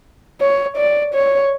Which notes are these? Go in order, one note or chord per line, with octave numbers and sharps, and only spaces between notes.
C#5
D5
C#5